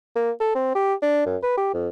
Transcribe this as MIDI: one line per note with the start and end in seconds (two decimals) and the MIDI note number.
0.16 0.31 58
0.40 0.50 69
0.55 0.75 60
0.75 0.94 67
1.02 1.25 62
1.26 1.37 42
1.42 1.53 71
1.57 1.71 67
1.74 1.88 41